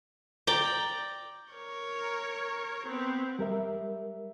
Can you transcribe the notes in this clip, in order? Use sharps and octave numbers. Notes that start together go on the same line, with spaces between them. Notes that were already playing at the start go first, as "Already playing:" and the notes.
D5 G5 A#5 D6
A#4 C#5
B3 C4
G3 A#4 E5